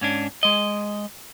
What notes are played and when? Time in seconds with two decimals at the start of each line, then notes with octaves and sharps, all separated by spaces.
0.01 G#2 C#4 D4
0.43 G#3 D#5